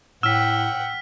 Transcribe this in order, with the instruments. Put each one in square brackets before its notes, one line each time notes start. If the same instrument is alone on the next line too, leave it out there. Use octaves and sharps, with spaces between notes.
[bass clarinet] A2 [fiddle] F#5 G5 [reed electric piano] E6 [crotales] F6 B6